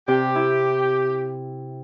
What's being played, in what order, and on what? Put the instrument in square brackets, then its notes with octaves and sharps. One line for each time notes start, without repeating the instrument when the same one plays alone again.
[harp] C3 G5 [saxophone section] G4
[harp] E4